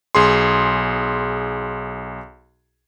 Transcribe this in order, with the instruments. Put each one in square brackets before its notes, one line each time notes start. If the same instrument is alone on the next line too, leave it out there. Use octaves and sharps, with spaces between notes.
[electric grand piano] B1 G#4 C6